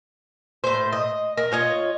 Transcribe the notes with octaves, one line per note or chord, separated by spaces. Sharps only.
A2 C5
D#5
A#4
F4 C#5 D#5